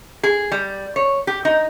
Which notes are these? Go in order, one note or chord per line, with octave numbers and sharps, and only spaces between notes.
G#4
G3
C#5
G4
D#4